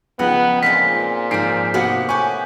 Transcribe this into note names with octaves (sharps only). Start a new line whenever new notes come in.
C#2 F3 B3 D#4 D#5 F#5
A#2 G#3 C4 F4 B6
G#2 F3 C7 D7
C3 A#3 B3 F#4 F5 F#5
A2 B3 G4 G#5 C#6